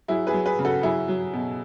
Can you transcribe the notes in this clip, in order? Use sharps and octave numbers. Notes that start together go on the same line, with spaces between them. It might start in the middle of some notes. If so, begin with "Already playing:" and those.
F#3 E4 G#4
G#4 B4
F#3
G#4 B4
C#3
F#4 A4
F#3 E4 G#4
F#3
B2